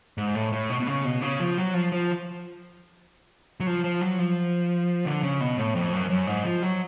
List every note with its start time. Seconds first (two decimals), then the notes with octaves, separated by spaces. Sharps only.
0.18 G#2
0.35 A2
0.52 A2
0.70 B2
0.80 B2
0.87 C#3
1.05 B2
1.22 C#3
1.40 F3
1.58 F#3
1.74 F3
1.92 F3
3.60 F#3
3.67 F3
3.84 F3
4.01 F#3
4.19 F3
5.05 D3
5.23 C#3
5.41 B2
5.58 A2
5.75 F2
5.93 F#2
6.10 F#2
6.27 G#2
6.45 F3
6.62 F#3